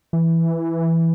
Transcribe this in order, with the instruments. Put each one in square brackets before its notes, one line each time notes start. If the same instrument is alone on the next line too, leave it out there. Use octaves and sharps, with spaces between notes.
[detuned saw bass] E3